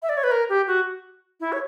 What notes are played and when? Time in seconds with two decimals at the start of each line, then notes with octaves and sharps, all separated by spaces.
0.02 E5
0.09 D5
0.17 C#5
0.24 B4
0.31 A#4
0.49 G4
0.67 F#4
1.40 E4
1.53 C#5